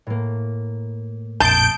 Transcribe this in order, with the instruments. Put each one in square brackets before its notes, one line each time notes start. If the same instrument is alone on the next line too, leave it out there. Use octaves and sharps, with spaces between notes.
[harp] A2 A#3
[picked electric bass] A#1 F2 [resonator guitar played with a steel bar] A5 [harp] D#6 C7 [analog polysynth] G6 D7